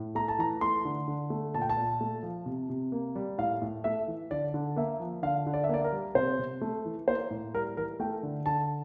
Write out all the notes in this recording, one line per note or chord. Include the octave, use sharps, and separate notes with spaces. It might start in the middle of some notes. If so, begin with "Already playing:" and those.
Already playing: A2
A3 A#5
A5
E3 A#5
A3 C6
D3
D3
A3
A#2 A5
G5
A5
A#2
A3
F3
C3
C3
A#3
G3
A2 F5
A2
A3 E5
E3
D3 D5
D3
A#3 E5
F3
D3 F5
D3
D5
E5
A#3 D5
A#4
G3
C3 C5
C3
A3
E3
A#3 C5
A2
G3 A#4
E3 A#4
A3 G5
D3
D3 A5